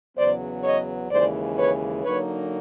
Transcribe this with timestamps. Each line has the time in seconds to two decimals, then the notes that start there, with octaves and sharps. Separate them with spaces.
0.17 E2 C#3 F#3 B3 C5 D5
0.64 C#5 D#5
1.11 D#2 C#3 E3 G#3 C5 D5
1.57 B4 C#5
2.04 D3 F#3 A#3 D#4 B4 C#5